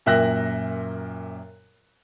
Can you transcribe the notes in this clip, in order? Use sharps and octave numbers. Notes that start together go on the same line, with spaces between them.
F#2 A#2 E5 G5 F#6 A#6